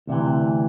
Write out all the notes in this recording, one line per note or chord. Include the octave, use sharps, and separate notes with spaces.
D2 C3 E3